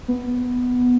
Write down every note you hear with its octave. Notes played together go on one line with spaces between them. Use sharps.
B3